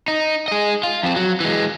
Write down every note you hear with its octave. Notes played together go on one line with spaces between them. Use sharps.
D#4
G#4 D#5
F4
F2 C4
F#3
E3 G#3